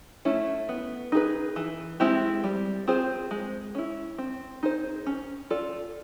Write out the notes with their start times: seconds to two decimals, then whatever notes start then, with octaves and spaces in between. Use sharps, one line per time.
0.25 A3 C#4 E4
0.69 B3
1.12 D#4 G#4 B4
1.56 E3
2.00 G#3 C4 E4 G4
2.44 G3
2.88 C4 F4 G#4 C5
3.31 G#3
3.75 C#4 E4
4.18 C4
4.63 D#4 G#4 C5
5.06 C#4
5.50 F4 A4 D5